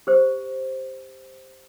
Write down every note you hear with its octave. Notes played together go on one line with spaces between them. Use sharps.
G4 C5